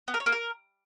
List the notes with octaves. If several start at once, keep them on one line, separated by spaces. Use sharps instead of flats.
B3
A#4
C#5
A#3
A#4